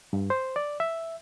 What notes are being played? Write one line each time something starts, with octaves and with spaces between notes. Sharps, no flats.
G2
C5
D5
E5